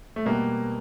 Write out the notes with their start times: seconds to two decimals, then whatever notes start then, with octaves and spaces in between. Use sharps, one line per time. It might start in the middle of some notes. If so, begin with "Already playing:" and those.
0.16 A3
0.26 B2 G3 A#3 B3